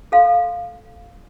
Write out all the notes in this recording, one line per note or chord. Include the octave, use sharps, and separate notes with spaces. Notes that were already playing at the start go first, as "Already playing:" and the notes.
A4 F5 C6